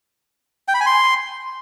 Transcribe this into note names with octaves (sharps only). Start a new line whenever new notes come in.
G5
B5
G#5
C6